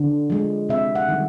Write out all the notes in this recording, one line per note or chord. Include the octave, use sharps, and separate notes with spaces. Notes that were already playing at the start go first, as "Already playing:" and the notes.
Already playing: D3
F3 G#3
C3 E5
F#5
D#3 G3